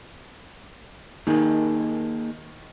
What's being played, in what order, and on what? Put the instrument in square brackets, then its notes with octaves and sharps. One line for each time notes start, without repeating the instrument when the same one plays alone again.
[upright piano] D#3 [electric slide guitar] A#3 D#4 G#4